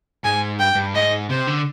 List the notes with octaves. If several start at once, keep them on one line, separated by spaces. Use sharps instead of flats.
G#2 G#5
G2 G5
G2
G#2 D#5
C3 C5
D3